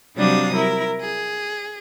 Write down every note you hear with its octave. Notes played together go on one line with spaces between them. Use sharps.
C3 F#3 G3 D4 F5 D#6
E4 A#4
G#4